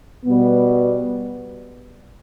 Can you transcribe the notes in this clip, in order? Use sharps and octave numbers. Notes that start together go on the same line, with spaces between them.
B2 G3 B3